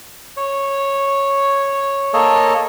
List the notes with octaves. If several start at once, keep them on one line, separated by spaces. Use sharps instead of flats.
C#5
A#3 A4 C#5 D#5